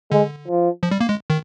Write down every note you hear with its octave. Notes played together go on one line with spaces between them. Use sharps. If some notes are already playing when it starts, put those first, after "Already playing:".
D3 G#3
F3
F3
G3
A#3
G#3
D#3